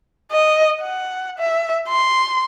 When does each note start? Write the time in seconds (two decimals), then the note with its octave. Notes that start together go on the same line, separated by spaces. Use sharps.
0.31 D#5
0.81 F#5
1.39 E5
1.88 C6